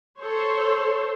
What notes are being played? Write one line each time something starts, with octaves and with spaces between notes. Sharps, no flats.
A4 C5 C#5